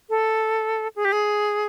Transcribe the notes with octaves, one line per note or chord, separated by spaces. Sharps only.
A4
G#4
G4
G#4